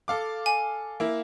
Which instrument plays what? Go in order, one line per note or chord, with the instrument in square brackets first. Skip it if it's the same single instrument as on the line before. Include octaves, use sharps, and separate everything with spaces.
[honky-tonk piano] A4 F5 D6
[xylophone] G#5
[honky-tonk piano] A#3 E4